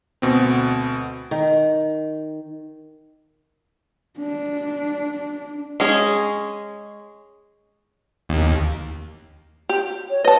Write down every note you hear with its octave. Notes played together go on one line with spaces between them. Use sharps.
D2 B2 C4
D#3
D4
G#3 C#4 G#4
D#2
G4
C#5
B4 D#5 A5